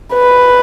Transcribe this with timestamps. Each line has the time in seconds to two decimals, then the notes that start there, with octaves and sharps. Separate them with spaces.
0.13 B4